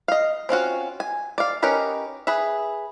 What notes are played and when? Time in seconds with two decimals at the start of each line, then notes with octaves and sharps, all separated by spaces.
0.08 D#5 F5
0.49 C4 C#4 F4 F#4
1.00 G#5
1.38 D5 F5
1.62 C#4 D#4 G4 A#4 B4
2.27 G#4 B4 E5